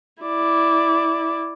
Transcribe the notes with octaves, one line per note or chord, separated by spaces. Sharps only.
E4 D5